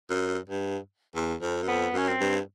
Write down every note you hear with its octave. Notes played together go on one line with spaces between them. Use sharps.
F#2
G2
E2
F2
F#2
F2 B3
F#2 C#4
C4
G2